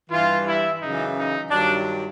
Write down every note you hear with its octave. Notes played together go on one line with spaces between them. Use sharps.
G2 E3 F4
E4
F#2 C#3 E3 D#4
D#4
G2 D#3 F#3 D4